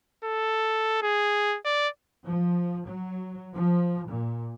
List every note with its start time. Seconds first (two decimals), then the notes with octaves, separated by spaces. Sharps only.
0.25 A4
1.02 G#4
1.65 D5
2.23 F3
2.86 F#3
3.54 F3
4.09 A#2